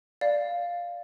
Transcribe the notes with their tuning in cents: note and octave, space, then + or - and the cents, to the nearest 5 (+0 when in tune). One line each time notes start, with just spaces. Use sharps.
D5 +0 F5 +0